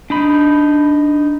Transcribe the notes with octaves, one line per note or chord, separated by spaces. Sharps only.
D4 D#4 B5